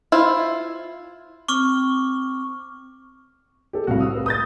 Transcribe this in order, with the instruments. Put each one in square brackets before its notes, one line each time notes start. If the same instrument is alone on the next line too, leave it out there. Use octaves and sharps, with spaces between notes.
[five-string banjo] E4 F4 C5
[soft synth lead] C4 [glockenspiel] C#6 D6 F6
[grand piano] G4 A4
[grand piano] C2 A2 C3 [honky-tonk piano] F#4 F5
[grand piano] D#6 E6
A#4 B4
[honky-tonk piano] D#6 G6 A6